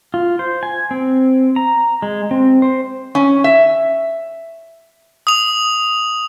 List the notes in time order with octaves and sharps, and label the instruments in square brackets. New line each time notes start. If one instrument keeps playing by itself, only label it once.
[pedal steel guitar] F4
C5
G#5
C4
A#5
G#3
C4
C5
[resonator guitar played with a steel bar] C#4
E5
[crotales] D#6 F7